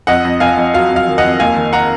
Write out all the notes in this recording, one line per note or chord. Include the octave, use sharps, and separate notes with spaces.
F2 D#5 F#5
F2
F2 F5 G#5
F2
F#3 F5
F2
F5
D#3
D#5 F#5
F2
D#2 F5 G#5
D#3
F#5 A#5